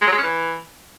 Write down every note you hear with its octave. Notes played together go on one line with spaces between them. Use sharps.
G#3
F#3
G#3
C#4
E3